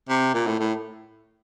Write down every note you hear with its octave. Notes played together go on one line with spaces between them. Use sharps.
C3
A#2
A2
A2